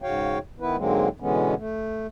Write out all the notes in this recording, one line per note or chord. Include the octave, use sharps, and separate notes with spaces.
G#2 C#3 F#4 C#5 F5 G5
D#3 B3 E4 B4
G#2 D3 F#3 G#3 A#3 C4
B2 D3 E3 G#3 B3 C#4
A3